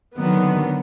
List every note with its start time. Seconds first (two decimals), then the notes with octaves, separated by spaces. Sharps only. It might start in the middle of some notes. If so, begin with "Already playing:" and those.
0.15 D3 D#3 F#3 B3